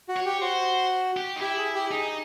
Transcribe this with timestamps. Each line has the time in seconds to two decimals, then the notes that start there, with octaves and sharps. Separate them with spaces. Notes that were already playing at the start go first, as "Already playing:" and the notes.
0.09 F#4
0.17 C#5
0.26 G4
0.42 F#4 C5
1.17 G4
1.36 D#4
1.41 E4 G4
1.57 G#4
1.75 G4
1.91 D#4 G#4